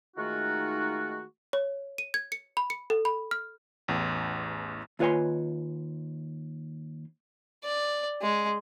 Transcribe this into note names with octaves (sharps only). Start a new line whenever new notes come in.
D#3 G#3 A3 D#4 F4 F#4
C#5
D#7
G#6
C#7
B5
C#7
A4
B5
F6
A1 E2
D#2 F4 B4 C#5 G#5 C6
D5
G#3